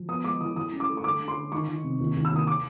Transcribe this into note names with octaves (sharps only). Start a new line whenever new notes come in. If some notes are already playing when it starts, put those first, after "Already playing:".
Already playing: F3
B3 D#6
G#3 D6
E3 D#6
E3 D#6
C#4
D6
A3
C#6
D3 D6
D3
C6
D3
D#3 C#6
D#3
C3
D#2
D#2
E6
D#2 D#6
D6